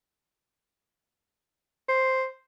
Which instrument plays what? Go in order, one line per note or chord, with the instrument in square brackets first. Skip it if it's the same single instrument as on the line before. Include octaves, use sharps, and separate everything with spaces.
[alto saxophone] C5